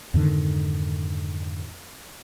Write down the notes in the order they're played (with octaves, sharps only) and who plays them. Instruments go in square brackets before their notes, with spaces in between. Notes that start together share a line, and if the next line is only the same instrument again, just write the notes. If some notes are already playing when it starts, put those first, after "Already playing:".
[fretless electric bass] F2 G#2 D3 D#3